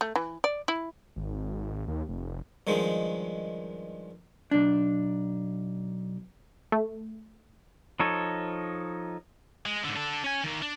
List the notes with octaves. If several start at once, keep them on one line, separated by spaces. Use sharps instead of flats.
A3
E3
D5
E4
G#1
D#2
F1
G2 D#3 F3 G#3
B1 D4
A3
F3 D#4 A4 C#5
G#3
G#2 D3
D4 A4
C#4 G#5
D#3 A#3
D4